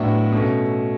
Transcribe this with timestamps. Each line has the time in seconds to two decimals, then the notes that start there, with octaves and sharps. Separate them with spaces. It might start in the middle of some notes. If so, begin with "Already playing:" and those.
Already playing: A2 F#3 B3 D4 E5
0.32 B2 A3 C#4